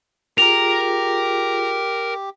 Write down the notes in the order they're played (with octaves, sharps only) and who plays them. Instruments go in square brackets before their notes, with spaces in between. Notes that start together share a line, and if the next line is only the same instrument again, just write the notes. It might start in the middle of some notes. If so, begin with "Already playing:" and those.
[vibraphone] F4 G#4 [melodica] G4 [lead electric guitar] A#4 A#5 [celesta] F7